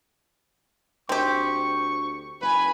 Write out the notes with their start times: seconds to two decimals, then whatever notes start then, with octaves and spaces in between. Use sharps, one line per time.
1.09 D2 C4 G4 C#6
2.42 F#1 B4 G#5 B5